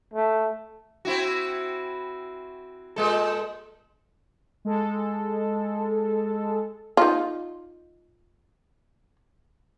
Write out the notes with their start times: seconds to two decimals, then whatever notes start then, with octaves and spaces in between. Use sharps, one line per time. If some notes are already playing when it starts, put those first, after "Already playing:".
0.13 A3
1.05 C4 E4 F#4
2.96 A#2 G#3 A4
4.65 G#3 A4
6.97 D#4 F4